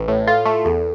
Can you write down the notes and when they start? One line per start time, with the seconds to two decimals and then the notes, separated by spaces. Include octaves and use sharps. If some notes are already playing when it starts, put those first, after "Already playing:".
Already playing: A1 B4
0.08 A2
0.27 F4 A4
0.46 A3
0.65 E2 A4